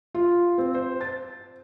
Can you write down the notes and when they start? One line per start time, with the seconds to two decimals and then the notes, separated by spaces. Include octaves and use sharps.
0.15 F4
0.58 C4
0.75 C5
1.01 A6